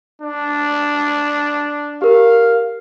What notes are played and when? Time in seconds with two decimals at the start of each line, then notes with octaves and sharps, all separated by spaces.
0.22 D4
2.02 G4 A#4 F5